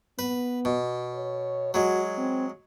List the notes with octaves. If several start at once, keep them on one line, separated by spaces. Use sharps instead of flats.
B3 B4
B2
C#5
F#3 G#3 F#4
C4